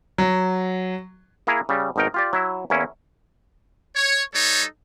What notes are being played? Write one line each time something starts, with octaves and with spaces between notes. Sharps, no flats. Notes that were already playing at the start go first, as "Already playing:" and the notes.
F#3
A#3 E4 G#4 A#5
C#3 G3
G#1 B2 D#4 A#4 G5
F4 G4 D5
F#3 E4 E5
E2 A#3 C#4 E4
C#5
G3 D#4 A4 C#5